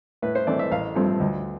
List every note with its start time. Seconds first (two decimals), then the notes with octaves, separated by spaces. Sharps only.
0.22 A2 B4
0.35 C5
0.47 E3 A3 C4 D5
0.59 E5
0.71 A1 F5
0.95 G2 F3 A3 C4
1.20 D2